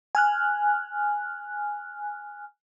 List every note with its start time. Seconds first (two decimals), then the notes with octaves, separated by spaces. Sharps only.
0.15 G#5 F6 F#6